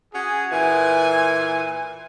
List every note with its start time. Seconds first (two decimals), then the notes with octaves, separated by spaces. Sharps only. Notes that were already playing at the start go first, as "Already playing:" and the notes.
0.14 C#4 F#4 G#4
0.50 A#2 E3 G#5